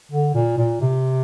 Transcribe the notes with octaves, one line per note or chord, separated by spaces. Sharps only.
D3
A#2
A#2
C3